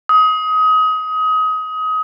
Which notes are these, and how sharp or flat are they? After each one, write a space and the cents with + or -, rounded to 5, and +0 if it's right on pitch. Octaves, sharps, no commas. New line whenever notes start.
D#6 +25